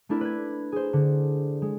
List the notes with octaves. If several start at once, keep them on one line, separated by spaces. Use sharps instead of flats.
A3 C4 D4 E4 A#4
B4 G#6
G#4 C5
D3
G#3